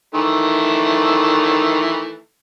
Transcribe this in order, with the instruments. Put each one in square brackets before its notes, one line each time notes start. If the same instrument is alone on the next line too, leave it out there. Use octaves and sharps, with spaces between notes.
[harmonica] D#3 E3 A3